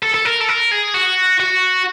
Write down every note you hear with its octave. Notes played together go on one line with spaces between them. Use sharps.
A4
A4
A#4
A4
A#4
G#4
F#4
F#4